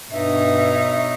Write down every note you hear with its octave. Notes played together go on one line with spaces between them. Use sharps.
G2 B2 D#4 C#5 E5